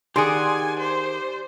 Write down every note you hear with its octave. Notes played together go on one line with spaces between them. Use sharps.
D#3 G4 G#4 D5 F#5 G#5 C6
C5